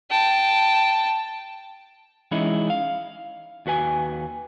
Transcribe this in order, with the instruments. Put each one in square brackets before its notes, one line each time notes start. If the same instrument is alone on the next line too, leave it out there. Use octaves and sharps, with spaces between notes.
[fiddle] G5 A5
[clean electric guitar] E3 G#3 C#4 D#4 E4
F5
D#2 F#4 B4 G#5